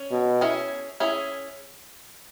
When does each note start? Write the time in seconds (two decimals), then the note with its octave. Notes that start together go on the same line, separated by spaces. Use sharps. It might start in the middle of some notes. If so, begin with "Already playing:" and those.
Already playing: C#4
0.11 B2
0.41 C#4 E4 G#4
1.00 C#4 E4 G#4